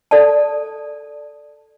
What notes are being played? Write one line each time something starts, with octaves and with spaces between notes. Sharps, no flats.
A4 D5 A5